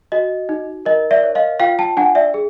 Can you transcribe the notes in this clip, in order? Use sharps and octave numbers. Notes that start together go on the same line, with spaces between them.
F#4 D#5
D#4
A#4 D#5
D5 E5
C#5
D#5 F5
F4 F5 G5
G5 A5
D4 F#5 G#5
D5 E5
G#4